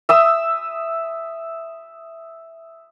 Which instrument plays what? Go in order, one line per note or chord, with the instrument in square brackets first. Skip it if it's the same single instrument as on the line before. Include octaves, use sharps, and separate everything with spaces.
[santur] E5 D#6 E6